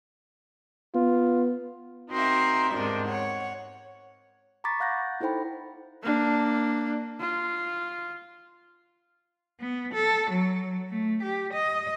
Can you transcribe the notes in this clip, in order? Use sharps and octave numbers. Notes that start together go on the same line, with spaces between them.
B3 F4
C4 D#4 F#4 A#4 C5 E5
E2 G#2 C3 D#3 D4
C#5 F#5
A#5 B5 C#6 D6 A6 B6
F5 F#5 F#6 G6 A6 A#6
D#4 E4 A4 C5 G5 B5
A#3 D4
F4
B3
A4
F#3
A3
G4
D#5